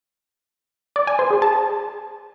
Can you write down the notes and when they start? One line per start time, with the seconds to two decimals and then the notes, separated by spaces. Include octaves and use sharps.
0.96 D5
1.07 G#5
1.19 C5
1.30 G#4
1.42 A5